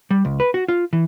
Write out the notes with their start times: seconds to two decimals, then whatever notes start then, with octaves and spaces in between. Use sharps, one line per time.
0.10 G3
0.25 C#2
0.40 B4
0.54 F#4
0.68 F4
0.93 E3